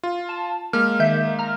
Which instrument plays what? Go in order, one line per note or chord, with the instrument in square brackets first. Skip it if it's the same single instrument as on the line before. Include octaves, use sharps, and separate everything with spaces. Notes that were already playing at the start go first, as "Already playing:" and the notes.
[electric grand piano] F4
[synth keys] A5
[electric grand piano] G#3 A#3 [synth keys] F6
[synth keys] D#3 E5 G6
A#5 F6